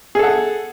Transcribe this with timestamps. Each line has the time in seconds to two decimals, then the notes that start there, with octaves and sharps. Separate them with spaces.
0.15 G#4
0.19 A4
0.23 F#5